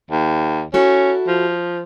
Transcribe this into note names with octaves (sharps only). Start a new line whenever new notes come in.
D#2
C#4 E4 F#4 A4
F3